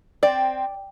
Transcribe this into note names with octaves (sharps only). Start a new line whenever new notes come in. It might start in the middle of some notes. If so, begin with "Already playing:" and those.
C4 D5